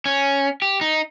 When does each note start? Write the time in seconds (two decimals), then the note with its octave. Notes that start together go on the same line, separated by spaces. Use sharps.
0.06 C#4
0.62 G4
0.81 D#4